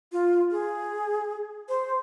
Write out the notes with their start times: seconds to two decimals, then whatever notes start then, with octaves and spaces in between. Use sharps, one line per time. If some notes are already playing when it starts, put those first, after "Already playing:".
0.12 F4
0.51 G#4
1.69 C5